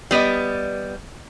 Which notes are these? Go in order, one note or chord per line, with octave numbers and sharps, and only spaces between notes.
G3 B3 D5 D#5